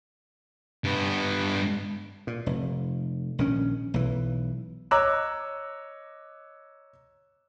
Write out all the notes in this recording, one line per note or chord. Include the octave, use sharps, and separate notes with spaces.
G2 B3
A#2
F1
A#1 D#3 C#4
B1 E3
C#5 D#5 A#5 D6 E6 F#6